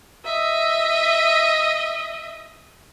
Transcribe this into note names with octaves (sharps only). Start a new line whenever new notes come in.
D#5 E5